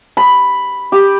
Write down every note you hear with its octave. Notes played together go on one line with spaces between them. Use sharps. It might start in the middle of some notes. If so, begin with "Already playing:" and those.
B5
G4